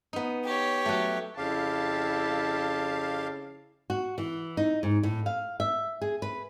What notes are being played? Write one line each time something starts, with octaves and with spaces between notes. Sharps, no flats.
B3 D#4
G4 C#5
F#3 A3
F2 C#3 E4 G4 F5 A5
F#4
E3
D#4
G#2
A2
F5
E5
G#4
B4